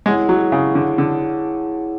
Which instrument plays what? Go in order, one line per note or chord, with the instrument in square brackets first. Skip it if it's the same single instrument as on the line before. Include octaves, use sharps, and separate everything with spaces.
[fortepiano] G#3 [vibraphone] E4 G#4 C#5 F#5
[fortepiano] F#3
C#3
D3
D3